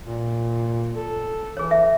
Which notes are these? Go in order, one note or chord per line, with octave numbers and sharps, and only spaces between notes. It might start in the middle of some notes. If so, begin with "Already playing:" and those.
A#2
A4
E3 G#4 C#5
E5